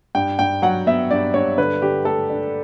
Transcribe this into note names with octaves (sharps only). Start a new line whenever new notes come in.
G2 G5
G2 G5
F#3 F#5
B3 E5
G2 D5
G2 C#5
D3 B4
D3 G4
A3 A4
D4